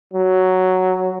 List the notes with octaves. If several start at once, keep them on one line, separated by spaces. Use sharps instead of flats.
F#3